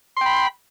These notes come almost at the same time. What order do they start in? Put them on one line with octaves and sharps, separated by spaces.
C6 G5 B5